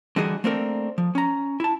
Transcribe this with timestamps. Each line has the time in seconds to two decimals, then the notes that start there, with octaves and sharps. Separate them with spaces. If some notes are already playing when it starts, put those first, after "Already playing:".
0.16 D3 E3 G3 D#4 F#4 G#4
0.44 A3 A#3 C4 D4 A4 A#4
0.98 F3
1.15 C#4 A#5
1.60 E4 A5